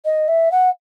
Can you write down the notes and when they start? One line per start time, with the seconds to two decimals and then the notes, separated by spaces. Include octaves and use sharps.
0.05 D#5
0.28 E5
0.52 F#5